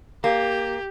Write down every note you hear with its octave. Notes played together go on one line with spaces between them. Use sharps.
A#3 G4